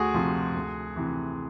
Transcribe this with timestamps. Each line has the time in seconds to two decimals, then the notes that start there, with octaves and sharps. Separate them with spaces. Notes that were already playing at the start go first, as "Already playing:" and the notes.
Already playing: D2 F#4 G#4
0.14 C3 F3
0.55 D2
0.96 C3 E3